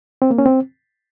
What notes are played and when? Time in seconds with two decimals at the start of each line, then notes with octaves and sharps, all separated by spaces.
0.22 C4
0.31 A#3
0.38 C#4
0.46 C4